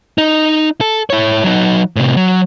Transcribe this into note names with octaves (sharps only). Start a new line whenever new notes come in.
D#4
A4
E4 C#5
F#3 D#4
A2 C3
F#3